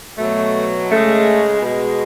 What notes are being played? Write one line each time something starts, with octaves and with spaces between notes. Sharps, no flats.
B2 F#3 A3
C#3 G#3 A3
B2 G#3